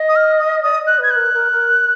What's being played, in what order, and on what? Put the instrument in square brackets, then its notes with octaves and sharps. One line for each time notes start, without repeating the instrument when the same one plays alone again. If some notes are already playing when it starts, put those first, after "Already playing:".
Already playing: [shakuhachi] D#5
[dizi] D#6
F6
D#6
[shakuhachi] D5 [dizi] D#6
[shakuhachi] D#5
[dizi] F#6
[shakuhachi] B4 [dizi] G#6
[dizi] F#6
[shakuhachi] A#4
A#4
A#4